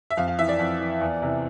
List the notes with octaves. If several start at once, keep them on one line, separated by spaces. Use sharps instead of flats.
E5
F2 F5
F5
E3 E5
D5
F2
E3
E2
C3 E3